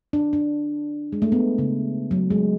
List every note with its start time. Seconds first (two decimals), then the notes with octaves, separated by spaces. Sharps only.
0.13 D4
0.33 D4
1.13 G#3
1.22 A3
1.32 B3
1.58 C#3
2.11 F#3
2.30 G#3